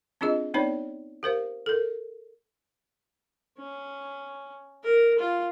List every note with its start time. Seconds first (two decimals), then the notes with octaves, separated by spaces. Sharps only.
0.21 C4 D4 F4 G#4 D#5
0.54 B3 C4 D#4 B4 C#5 D5
1.23 G4 A#4 C5 F5
1.66 A4 A#4
3.58 C#4
4.84 A#4
5.19 F4